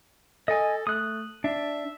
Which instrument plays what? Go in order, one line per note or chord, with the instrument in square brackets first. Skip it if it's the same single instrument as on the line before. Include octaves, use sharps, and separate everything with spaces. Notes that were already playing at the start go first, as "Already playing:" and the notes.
[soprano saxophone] A4 [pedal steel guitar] D#5 G#5
[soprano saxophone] A3 [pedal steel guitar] D#6 F#6
[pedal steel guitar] D4 [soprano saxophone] E5